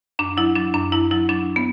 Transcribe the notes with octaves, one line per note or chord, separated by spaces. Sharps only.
F#2 D4
F#3 E4
F#3 D4
F#2 D4
F#2 E4
F#3 E4
F#3 D4
B3